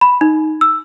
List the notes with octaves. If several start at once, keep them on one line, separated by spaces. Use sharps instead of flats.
B5
D#4
E6